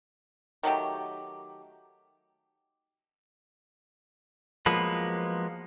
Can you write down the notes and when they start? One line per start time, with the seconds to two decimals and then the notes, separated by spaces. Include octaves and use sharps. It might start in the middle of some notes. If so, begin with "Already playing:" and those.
0.63 D#3 F#3 A3 G4
4.66 F3 F#3 G#3 A#3 B3 B4